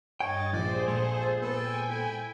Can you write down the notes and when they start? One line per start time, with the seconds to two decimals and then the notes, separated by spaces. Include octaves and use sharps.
0.21 G2 C#5 D#5 G5 A6
0.53 A#1 G#4 C5 D5 G6
0.88 A#2 G#3 A4
1.42 B3 A4 G5 G#5
1.90 E4 A4